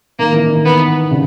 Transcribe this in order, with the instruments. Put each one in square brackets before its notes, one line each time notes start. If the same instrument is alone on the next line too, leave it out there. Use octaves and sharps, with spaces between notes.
[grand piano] D#3 [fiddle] A#3
[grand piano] E3
D#3
[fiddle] B3
[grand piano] C#3